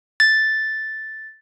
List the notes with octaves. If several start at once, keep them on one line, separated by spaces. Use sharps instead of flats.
A6